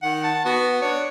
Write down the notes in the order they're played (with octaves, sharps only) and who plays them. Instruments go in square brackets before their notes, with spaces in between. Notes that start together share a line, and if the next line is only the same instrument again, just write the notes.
[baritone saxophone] D#3 [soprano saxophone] F#5
[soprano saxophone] A5
[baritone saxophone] B3 [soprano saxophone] F#4
[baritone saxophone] D4 [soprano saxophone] C#5